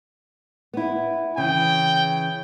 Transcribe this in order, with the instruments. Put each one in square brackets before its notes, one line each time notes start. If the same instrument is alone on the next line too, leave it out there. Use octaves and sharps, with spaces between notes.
[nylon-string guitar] B3 E4
[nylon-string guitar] C#3 E3 [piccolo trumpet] G5